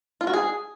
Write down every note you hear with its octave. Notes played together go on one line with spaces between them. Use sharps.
F4
F#4
G#4